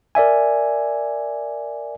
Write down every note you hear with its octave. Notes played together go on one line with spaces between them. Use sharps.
A#4 D5 E5 G#5